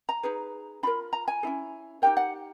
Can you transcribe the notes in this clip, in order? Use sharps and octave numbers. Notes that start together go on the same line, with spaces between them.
A#5
D#4 G#4 B4
D4 F4 A#4 B5
A#5
G#5
C#4 E4 G#4
D#4 G4 A#4 G5
F#5